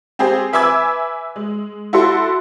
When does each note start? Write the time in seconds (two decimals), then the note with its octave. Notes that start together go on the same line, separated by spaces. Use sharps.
0.19 C4 G4 G#4 C5
0.53 B4 E5 G#5 D6 E6 G#6
1.36 G#3
1.93 E4 F#4 A4 C6